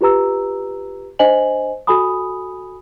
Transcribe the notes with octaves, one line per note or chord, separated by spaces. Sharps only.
F4 G4 B4 A#5 E6
D4 C5 D#5 G#5 F#7
F#4 A4 G#5 B5 D#6